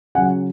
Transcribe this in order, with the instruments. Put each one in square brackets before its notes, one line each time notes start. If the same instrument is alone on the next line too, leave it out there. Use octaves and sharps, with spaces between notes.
[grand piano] C#3 F#3 F#5 G#5